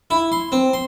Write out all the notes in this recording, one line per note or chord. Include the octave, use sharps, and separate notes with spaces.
E4
C6
C4
C6